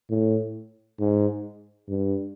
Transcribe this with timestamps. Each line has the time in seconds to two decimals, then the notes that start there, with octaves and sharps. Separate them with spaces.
0.10 A2
1.00 G#2
1.89 G2